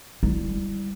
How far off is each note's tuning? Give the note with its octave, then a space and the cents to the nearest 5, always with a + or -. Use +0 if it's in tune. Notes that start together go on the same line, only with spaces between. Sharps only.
G3 +0 E4 +0